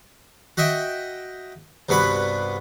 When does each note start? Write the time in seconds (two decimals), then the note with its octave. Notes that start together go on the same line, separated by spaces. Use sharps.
0.57 F#4 D#5 E5 G5
1.89 C2 G2 B3 F#4 B5